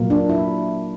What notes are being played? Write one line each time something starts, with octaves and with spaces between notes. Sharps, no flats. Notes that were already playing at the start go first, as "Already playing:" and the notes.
Already playing: A#2 F#3 A#3
D4
E4